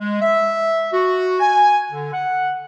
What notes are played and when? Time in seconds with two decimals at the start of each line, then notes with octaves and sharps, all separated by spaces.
0.01 G#3
0.21 E5
0.92 F#4
1.40 G#5
1.91 D3
2.13 F#5